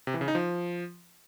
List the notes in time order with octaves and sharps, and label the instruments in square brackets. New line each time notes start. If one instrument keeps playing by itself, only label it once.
[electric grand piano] C3
E3
C#3
D#4
F3